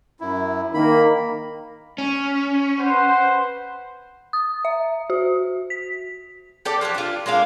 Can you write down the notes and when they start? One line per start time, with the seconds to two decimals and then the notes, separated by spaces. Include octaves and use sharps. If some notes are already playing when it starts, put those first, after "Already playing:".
0.20 F#2 E4
0.74 D#3 A#3 B5
1.98 C#4
2.80 B4 C5 F#5
4.33 D#6
4.65 E5
5.10 F#4
5.70 B6
6.65 G4 A4 D5
6.81 F3 F#3 A3 G4
6.94 D4 F4
7.26 G#3 A#3 D4 F5